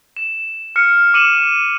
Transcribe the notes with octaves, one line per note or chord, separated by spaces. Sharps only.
E7
F6 C#7
D6 C#7 D#7 E7 F#7